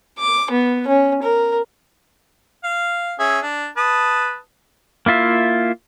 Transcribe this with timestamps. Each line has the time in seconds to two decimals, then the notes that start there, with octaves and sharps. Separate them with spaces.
0.19 D6
0.51 B3
0.88 C#4
1.23 A#4
2.64 F5
3.20 C#4 G#4 E5
3.42 D4
3.77 B4 A5 D#6
5.06 A#3 E4 F4 E5